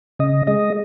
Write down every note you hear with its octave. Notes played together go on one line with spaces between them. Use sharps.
C#3 D#5
G#3 D#5